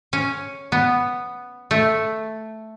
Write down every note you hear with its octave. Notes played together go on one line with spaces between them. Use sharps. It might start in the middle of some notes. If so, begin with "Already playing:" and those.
C#4
B3
A3